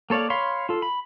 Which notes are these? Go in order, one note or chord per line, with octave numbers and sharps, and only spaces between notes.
A#3 A4 C#5 D5 F5
C#5 F5 B5 C6
F4 A4
B5